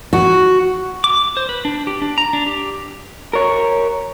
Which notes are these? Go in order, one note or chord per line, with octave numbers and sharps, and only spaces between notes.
F#4
D6
C5
B4
D4
G4
D4
A#5
D4
G4
A#4 C#5